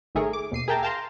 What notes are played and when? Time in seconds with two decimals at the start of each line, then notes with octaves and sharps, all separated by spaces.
0.15 G#1 D#3 A3 G#4 A#4 C#5
0.33 D6
0.51 D#2 B2 C7 D#7
0.68 G#4 A#4 E5 G5 A5 A#5
0.83 F5 G5 A5 A#5 C6